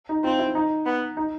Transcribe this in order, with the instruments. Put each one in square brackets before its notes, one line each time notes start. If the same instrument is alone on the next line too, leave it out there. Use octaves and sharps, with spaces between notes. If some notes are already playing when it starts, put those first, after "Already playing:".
[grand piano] D#4
[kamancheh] C4 [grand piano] F4
[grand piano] E4
D#4
[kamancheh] B3
[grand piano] D#4